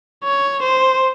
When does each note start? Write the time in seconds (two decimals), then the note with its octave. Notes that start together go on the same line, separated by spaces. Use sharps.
0.24 C#5
0.63 C5